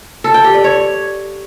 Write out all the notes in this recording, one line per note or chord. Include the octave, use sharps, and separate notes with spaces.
A4
G5
G4
D5
C#5